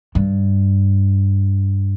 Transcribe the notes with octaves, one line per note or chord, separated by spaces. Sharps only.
G2